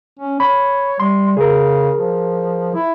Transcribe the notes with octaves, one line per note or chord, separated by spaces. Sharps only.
C#4
C#5 B5
G3 C6
C#3 G#4 A#4
F3
E4